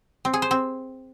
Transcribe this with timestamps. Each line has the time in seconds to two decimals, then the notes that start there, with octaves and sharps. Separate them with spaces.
0.25 C4
0.34 G#4
0.42 C5
0.51 C4